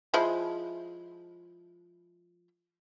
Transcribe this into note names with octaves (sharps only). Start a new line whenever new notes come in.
F3 G#3 E4